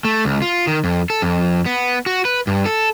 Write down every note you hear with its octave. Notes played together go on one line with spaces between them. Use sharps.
A3
C#2
F4
D#3
F2
A4
F2
B3
F#4
B4
G2
A4